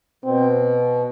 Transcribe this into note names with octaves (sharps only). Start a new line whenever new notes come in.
B2 C4